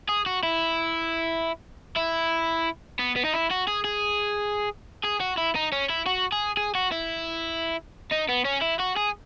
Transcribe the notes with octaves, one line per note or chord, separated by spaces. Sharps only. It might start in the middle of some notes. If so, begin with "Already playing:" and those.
G#4
F#4
E4
E4
B3
B3
D#4
E4
F#4
G#4
G#4
G#4
F#4
E4
D#4
C#4
E4
F#4
G#4
G#4
F#4
E4
D#4
B3
C#4
E4
F#4
G#4